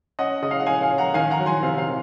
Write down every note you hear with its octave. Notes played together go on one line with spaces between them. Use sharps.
C#4 D#5 F#5
C#3 D#5
F5
F#5
C#4 F5 G#5
F5 G#5
C#4
F#5 A#5
D#3 F5 G#5
F#5 A#5
F#3
G#5 C6
C3 F5
F5
D#3